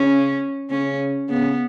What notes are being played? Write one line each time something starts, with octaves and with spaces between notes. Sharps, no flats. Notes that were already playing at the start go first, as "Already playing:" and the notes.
Already playing: C#3 C#4
C#3 C#4
C#3 B3